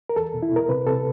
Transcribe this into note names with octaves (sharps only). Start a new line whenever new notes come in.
A#4
E2 A4
B2
E4
B2 A#4
C3 B4
C3 A4